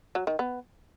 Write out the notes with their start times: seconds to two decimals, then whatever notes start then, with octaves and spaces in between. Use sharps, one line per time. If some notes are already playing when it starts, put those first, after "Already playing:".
0.15 F#3
0.27 D#3
0.39 B3